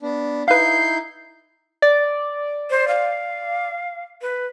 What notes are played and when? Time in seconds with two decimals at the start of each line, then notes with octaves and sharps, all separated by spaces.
0.02 B3 D4
0.48 D#4 E4 B4 F5 G6 C7
1.82 D5
2.70 C5
2.88 F5
4.22 B4